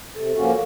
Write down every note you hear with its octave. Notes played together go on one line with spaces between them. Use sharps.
C3 A4
F3 A#3 C#4 F#4